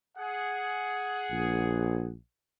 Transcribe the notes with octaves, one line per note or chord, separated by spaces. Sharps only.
G#4 F#5
A#1